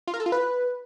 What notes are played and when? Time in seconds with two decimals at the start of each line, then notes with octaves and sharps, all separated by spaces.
0.07 F4
0.14 A#4
0.20 A4
0.26 F4
0.32 B4